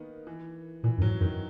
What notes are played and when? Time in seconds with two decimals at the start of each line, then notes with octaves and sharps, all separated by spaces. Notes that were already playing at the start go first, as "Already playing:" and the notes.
Already playing: D#3 A#3 B3 D#4
0.27 E3
0.83 A#2 E3
0.98 F#2
1.02 G#2 F#3
1.20 F#2 D#3